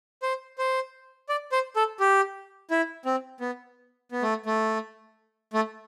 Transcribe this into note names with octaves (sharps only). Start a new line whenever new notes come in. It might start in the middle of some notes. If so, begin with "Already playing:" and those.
C5
C5
D5
C5
A4
G4
E4
C4
B3
B3
A3
A3
A3